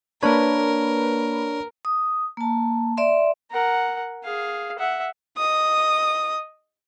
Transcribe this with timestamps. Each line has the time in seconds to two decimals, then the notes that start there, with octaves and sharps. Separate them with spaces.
0.23 A#3 D4 A#4 B4 C#5
1.85 D#6
2.37 A#3 A5
2.97 D5 E5 C6
3.51 A#4 F#5
4.24 G#4 F5
4.79 E5 F#5
5.37 D#5 D#6